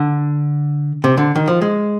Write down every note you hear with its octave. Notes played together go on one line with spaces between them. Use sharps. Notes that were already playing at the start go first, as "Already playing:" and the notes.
Already playing: D3
C3
D3
D#3
F3
G#3